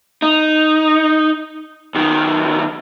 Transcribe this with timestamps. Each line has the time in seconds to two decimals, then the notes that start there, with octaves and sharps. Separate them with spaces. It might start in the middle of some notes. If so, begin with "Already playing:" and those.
0.22 D#4
1.94 B1 D#3